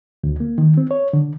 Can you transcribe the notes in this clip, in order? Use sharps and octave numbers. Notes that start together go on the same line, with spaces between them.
D2
A#3
D#3
C4
C#5
D3